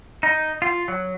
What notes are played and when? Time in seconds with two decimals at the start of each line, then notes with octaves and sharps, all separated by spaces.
0.23 D#4
0.62 F4
0.88 F#3